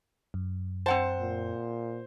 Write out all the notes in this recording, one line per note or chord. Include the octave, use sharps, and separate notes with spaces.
F#2
C4 C5 F#5 A5
A#2